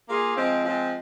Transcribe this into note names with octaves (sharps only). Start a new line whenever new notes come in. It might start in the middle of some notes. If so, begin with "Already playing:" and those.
A#3 F4 G#4
F3 G#3 C4
F3 G#3 C4